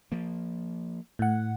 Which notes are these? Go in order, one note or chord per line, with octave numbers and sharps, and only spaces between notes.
F3 A#3
A2 F#5